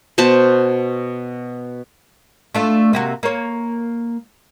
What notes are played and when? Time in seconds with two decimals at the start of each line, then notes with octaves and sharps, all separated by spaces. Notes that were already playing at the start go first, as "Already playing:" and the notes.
0.18 B2 C5 F#5 A5
2.54 A3 D4 F4
2.93 C3 A#3 F#4
3.23 A#3 C#5